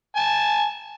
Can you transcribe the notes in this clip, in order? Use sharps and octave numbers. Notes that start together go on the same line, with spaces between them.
G#5 A5